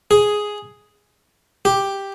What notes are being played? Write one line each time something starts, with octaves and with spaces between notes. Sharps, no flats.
G#4
G4